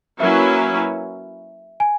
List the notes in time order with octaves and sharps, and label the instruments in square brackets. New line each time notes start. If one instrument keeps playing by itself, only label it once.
[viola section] F#3 A#3 C#4 E4 B4 [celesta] E5
[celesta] G#5